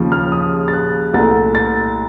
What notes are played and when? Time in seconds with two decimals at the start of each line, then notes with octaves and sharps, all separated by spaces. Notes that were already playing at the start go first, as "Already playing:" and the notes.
Already playing: D#2 C#3 F3
0.12 F6
0.32 D#6
0.68 A6
0.73 F#6
1.14 C2 A#2 A3 A6
1.55 A6